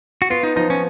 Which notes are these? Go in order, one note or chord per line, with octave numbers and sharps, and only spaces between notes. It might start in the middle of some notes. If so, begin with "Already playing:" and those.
F#4
B3 F4
D#4
F3 D#4
C#4